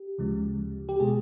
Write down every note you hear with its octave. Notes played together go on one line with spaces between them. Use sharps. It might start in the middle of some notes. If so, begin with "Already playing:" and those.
Already playing: G4
D2 C#3 F3 G#3
G4
B2 G#3 G#4